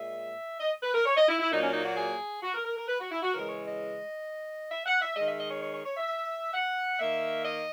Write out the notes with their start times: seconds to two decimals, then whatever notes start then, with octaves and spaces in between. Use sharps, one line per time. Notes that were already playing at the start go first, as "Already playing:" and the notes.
Already playing: A#2 G#3 E5
0.60 D#5
0.83 B4
0.94 A#4
1.06 C#5
1.17 D#5
1.29 E4
1.40 E4
1.51 A#2 F#3 A#3 D#4
1.63 C#4
1.74 D#4
1.86 F#4
1.97 G#4
2.43 F#4
2.54 A#4
2.65 A#4
2.77 A#4
2.88 B4
3.00 F#4
3.12 E4
3.22 F#4
3.34 C#3 E3 G#3 A#4
3.49 C#5
3.65 D#5
4.71 E5
4.86 F#5
5.01 E5
5.17 D#3 G#3 D#5
5.28 E5
5.40 D#5
5.51 C#5
5.63 C#5
5.74 C#5
5.85 C#5
5.97 E5
6.54 F#5
7.00 D#3 A#3 E5
7.45 D#5